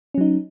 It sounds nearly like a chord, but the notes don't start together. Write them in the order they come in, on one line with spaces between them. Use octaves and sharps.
C#4 F#3 D#4